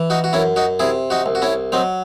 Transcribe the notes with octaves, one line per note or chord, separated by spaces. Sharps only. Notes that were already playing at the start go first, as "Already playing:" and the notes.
Already playing: E3
D#4 F#4
F#4
F#2 C#4 E4
D#4 F#4
C3 E4 G#4
D#4 F#4
C2
F#4
C#4 E4
F#3 C4 D#4